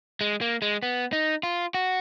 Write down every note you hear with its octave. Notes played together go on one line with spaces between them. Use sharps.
G#3
A#3
G#3
B3
D#4
F4
F#4